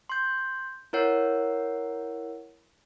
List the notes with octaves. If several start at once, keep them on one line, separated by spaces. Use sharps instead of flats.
C6 G6
E4 A#4 C#5 F#5